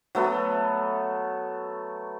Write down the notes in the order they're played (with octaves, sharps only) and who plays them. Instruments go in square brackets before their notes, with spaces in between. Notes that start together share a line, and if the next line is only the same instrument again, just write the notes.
[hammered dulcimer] F#3 A3 B3